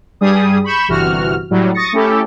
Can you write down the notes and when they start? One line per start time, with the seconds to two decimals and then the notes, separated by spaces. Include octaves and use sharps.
0.21 G2 G3 G#4 D#6
0.64 B5 C#6 G6 E7
0.88 G1 C3 E3 F#4 F6
1.50 A2 F#3 G3
1.74 C#6 D#6 A6 A#6 C#7
1.93 A3 C#4 E4 G4 A4